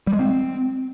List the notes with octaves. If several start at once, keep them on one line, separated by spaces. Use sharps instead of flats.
G3
G#3
C4